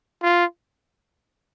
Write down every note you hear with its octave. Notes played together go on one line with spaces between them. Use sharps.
F4